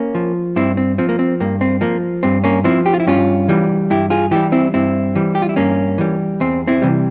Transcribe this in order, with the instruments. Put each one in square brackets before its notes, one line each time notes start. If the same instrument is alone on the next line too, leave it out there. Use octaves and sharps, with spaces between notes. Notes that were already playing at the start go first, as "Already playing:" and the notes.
Already playing: [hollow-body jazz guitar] A#3 C#4
F3
G2 C4 E4
C4
F3 C4
A#3
C4
G2 A#3
C4
F3 A#3
G2 C4
A#3 C#4
F3 C4 E4
G4
F4
E4
G2 C#4 F4
E3 G3
G2 E4 G4
F4 G#4
E3 G3 E4 G4
C4 E4
G2 C4 E4
E3 G3
G4
F4
E4
G2 A#3 C#4
E3 G3
E2 C4
C4 E4
C3 E3 G3